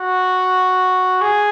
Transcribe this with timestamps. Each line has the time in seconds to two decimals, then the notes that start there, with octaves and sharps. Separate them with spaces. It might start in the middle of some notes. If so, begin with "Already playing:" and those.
Already playing: F#4
1.21 G#4